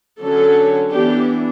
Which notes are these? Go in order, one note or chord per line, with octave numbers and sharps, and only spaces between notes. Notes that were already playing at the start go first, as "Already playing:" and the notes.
D3 F#3 C#4 A4
E3 B3 D4 G4